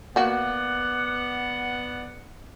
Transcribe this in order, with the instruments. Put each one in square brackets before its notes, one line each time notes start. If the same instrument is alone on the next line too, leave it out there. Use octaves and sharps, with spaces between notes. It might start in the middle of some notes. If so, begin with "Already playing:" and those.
[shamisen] A#3 F#4 [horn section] B3 D5 F#5